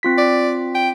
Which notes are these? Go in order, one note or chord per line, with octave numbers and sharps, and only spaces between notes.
C4 F4 B6
D5
G5